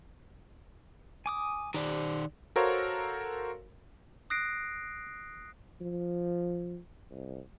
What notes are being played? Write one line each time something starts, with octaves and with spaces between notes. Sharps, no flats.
G#5 D6 D#6
D#3 G4 C5 D5
F#4 A4 A#4 C5 C#5 F5
D#6 F#6 A#6 C7 D7
F3
C2